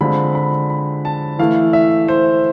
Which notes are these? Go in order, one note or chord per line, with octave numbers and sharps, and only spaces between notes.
D3 G#3 C4 F4 B5
B5
B5
A5
E3 A3 E4 F5
E5
C5